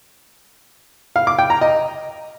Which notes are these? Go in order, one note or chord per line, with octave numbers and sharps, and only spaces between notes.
F5
D6
G5
A#5
D#5